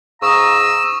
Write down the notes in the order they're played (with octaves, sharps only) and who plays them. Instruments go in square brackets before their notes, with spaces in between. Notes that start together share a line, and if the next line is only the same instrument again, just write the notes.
[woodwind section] G#2 F5 A#5 [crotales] C#6 D#6 E7 [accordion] E6